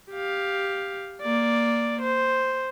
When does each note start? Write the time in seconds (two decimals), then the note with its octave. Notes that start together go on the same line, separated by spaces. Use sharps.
0.11 G4 F5
1.22 A#3 D5
2.02 C5